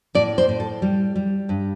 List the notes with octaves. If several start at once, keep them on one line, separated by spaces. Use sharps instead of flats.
A2 D5
C5
A2
A4
G3
G3
G2